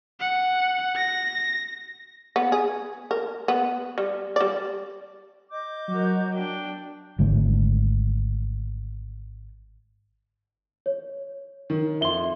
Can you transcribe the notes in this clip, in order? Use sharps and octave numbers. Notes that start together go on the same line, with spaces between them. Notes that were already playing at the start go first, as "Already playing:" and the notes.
F#5
A#6
B3
G#4
A#4
B3
G3
G3 D5
D#5 D6 G6
F#3 F#4 A#4
D4 G5
G#1 D3 G#3 A3
C#5
D#3
F2 E5 C6 G7